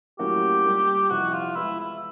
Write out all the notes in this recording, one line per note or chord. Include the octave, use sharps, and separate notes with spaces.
A2 F#3 A#3 C#4 F#4 G4
A#2 G3 A#3
F2 C3 E3 F#4
F4
E3 G#3 B3 E4
E4